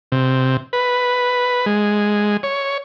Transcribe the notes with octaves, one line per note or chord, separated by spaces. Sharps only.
C3
B4
G#3
C#5